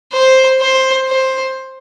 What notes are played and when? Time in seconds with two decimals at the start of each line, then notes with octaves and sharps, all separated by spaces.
0.12 C5
0.60 C5
1.08 C5